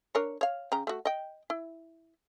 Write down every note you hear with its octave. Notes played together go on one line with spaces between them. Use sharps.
D4 A#4 C#5
C#5 F5
C#3 G5 A#5
A3 F#4
D#5 G5
E4